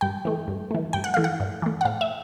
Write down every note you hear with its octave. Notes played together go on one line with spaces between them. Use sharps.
G2 G5
E3 A3
G2
E3 A3
G2 G5
F#5
E3 A3 F5
F#5
G2
E3 A3
F#5
A2 F5
E5